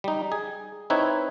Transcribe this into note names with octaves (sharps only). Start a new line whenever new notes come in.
G3 D#4
G#4
C4 D#4 E4 B4 C#5